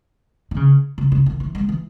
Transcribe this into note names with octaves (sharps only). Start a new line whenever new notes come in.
D#3
C#3
C#3
C#3
D#3
E3
G#3
E3